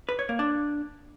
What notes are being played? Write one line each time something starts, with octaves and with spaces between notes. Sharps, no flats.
B4
C#5
A#3
D4